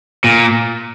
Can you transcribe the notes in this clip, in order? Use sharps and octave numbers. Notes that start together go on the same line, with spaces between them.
A#2